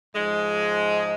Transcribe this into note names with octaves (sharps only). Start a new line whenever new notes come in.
G#2 F3 G#3